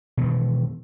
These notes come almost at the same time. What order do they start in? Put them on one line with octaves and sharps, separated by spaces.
B2 E3 D#3